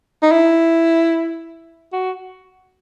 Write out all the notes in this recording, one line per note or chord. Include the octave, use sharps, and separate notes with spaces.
D#4
E4
F#4